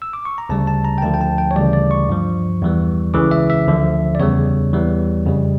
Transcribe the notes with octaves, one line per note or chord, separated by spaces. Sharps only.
E6
D6
C#6
A#5
D2 C#3 G3 A5
A5
A#5
G5
D2 D3 F3 A5
G5
A5
G5
C#5
D2 C#3 E3 G3 D5
D5
C#6
G2 F3
E2 E3 G3
C#2 C#3 E3 D6
E5
E5
D2 D3 F3
D5
E2 C#3 G3 C#5
E2 E3 G3
F2 C#3 G3